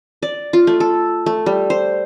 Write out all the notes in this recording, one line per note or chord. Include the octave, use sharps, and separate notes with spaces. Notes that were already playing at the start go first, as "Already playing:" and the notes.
D5
F4
A3
A4
A3
G3
C5